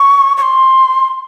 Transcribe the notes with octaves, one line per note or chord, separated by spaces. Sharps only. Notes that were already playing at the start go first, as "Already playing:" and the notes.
Already playing: C#6
C#6
C6